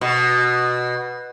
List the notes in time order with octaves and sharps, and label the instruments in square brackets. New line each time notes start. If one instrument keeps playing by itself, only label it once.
[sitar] B2